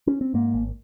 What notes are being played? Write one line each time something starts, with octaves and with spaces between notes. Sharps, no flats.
C#4
C4
G#2 A#3
G#1